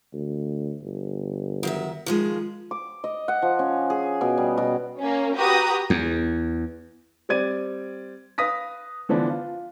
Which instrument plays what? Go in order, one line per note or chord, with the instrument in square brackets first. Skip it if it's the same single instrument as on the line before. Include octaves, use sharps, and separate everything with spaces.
[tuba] D2
G1
[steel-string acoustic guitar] D#3 F#3 E5
D#3 F3 G#3
[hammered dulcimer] D6
D#5
F#5
F3
C#4
G#4
B2
G3
B2
[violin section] A#3 C#4
F#4 G4 B4 A#5 D#6
[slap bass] E2
[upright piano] G3 C4 D5 G#6 D#7
B4 F5 D#6 A#6 B6
D3 E3 F3 B3 D4
F4